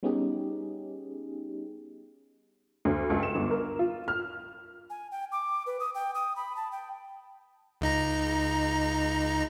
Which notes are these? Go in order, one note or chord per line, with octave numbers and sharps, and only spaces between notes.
G3 B3 C#4 D#4 G4 G#4
D2
C#2
E7
G1
A#4
F4
F6
G#5
G5
D6
B4
D#6
G5
D#6
B5
A5
G5
C#2 D#4 A#5